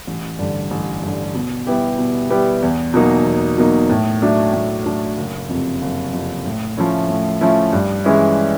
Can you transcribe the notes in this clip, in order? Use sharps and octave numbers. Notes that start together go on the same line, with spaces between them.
A1
G2 D3
A1
G2 D3
B2
G3 B3 E4 G4
B2
G3 B3 E4 G4
E2
B2 F#3 A#3 D#4
E2
B2 F#3 A#3 D#4
A2
F#3 A3 D4
A2
F#3 A3 D4
F#1
F2 C3
F#1
F2 C3
A2
F3 A3 C#4 E4
A2
F3 A3 C#4 E4
G2
E3 G#3 C#4 E4